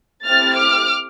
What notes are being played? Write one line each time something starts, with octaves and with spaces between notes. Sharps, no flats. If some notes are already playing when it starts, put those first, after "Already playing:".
A3 C4 E4 G4 F6 A6
D6 F6